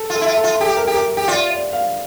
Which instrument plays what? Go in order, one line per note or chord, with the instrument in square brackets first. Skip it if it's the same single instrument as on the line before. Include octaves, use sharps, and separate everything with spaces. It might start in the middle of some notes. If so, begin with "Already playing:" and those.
Already playing: [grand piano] A4
[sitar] F4
[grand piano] A4
[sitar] E4
F4
[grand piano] A4
[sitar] F4
[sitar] G4 [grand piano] A4
[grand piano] A#4
[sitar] G4
[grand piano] A#4
[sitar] G4
[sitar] F4 [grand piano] D5
[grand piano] D5
F5